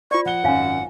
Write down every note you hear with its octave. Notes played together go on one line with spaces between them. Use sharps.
F4 C5 D5 C#6
F3 F#5 G7
G#1 F#2 C#5 F5 G#5